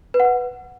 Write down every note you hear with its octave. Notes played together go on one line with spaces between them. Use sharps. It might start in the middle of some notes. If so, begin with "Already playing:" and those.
B4
F#5
B4